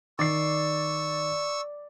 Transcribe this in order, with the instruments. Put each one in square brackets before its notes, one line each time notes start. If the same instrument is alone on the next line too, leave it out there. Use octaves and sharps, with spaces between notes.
[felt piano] D#3 C7 [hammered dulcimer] D5 [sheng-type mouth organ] C#6 E6